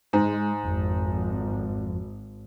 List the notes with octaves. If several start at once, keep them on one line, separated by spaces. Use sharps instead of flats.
G#2 G#3
G#1 F2